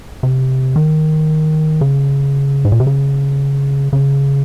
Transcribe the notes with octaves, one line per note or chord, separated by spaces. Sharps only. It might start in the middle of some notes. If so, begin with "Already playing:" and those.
C3
D#3
C#3
G#2
A#2
C3
C#3
C#3